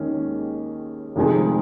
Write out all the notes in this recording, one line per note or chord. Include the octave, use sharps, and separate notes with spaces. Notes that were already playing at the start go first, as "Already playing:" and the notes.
Already playing: D#2 D#3 G#3 C#4
F1 F2 D#3 G#3